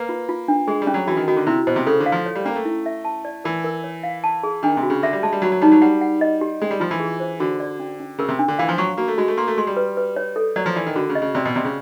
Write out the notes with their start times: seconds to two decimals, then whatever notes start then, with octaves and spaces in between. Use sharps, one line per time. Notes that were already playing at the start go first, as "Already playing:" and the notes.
Already playing: A#3 B4
0.09 F4
0.29 F4
0.48 D4
0.68 G#3 G#4
0.82 G3
0.87 C#4
0.94 F#3
1.07 E3 F#4
1.17 D#3
1.28 D#3 F#4
1.37 D3
1.47 C3 E4
1.67 B2 C5
1.76 C3
1.87 C#3 A4
2.00 D3
2.06 F5
2.12 F3
2.26 C#5
2.35 G3
2.45 A#3 C#4
2.56 A3
2.65 E4
2.86 E5
3.05 A5
3.25 D5
3.45 E3 A#4
3.64 A#4
3.84 C#5
4.03 F5
4.24 A5
4.44 G#4
4.63 D#3 D4
4.77 C3
4.83 F#4
4.90 C#3
5.03 D3 E5
5.13 G3
5.23 G#3 A5
5.33 G3
5.42 F#3 F#4
5.52 F#3
5.61 G3 D#4
5.72 F#3
5.82 G3 F#5
6.01 F#5
6.21 D#5
6.41 G4
6.62 G#3 C#4
6.71 G3
6.80 F3 F4
6.91 E3
7.00 G#4
7.20 C5
7.40 D3 F#4
7.60 D5
7.80 C#4
8.00 C#4
8.18 C#3 A#4
8.29 C3
8.39 D4
8.48 D3
8.59 E3 F5
8.69 F3
8.78 F#3 C#6
8.98 A#3 F#4
9.08 A3
9.18 G#3 F#4
9.28 A3
9.37 A#3 C6
9.48 A3
9.57 G#3 C6
9.67 G3
9.77 B4
9.97 B4
10.16 C#5
10.36 A4
10.56 F#3 D5
10.66 F3
10.76 E3 D5
10.86 D#3
10.96 D3 F#4
11.09 C#3
11.15 D#5
11.22 C#3
11.35 C3 D5
11.45 B2
11.55 C3 D5
11.65 C#3